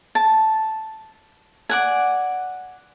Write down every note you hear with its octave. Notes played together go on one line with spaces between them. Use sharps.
A5
D5 F#5 G#5